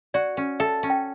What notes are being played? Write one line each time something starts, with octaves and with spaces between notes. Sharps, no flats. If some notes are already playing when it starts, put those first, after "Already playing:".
F#4 D5
C#4
A4 E5
C#4
G5